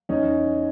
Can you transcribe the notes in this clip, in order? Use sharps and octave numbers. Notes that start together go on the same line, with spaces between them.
E2 C#4 D#4